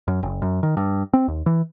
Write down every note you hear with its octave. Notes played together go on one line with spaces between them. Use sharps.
F#2
F#1
F#2
D#3
G2
C4
D#2
E3